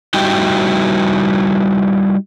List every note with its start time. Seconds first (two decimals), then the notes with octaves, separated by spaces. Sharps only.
0.14 G3 D#4 E4 F#4 G5